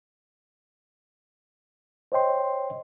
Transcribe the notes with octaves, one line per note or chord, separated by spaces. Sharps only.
C5 C#5 D#5 G5 C6